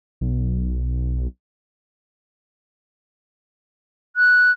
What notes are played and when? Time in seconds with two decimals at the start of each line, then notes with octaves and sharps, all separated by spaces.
0.21 B1
4.16 F#6